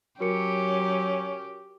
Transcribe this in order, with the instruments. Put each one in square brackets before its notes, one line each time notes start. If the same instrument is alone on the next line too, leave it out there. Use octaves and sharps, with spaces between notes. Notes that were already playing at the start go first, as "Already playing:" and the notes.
[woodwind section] F#3 [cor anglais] C#4 [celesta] F#4 A#4 C#7 [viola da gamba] G4